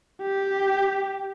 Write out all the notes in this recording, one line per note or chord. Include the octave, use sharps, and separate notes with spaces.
G4